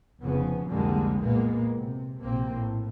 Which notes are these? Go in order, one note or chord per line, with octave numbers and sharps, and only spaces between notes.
F1 F2 C#3 F3 B3
C2 F2 D3 G3 G#3 A#3
A#2 G#3 A#3 B3
C3
A#1 C3 A#3 C4
A2